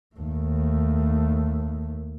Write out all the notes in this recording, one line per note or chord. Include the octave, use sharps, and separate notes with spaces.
D#2 A3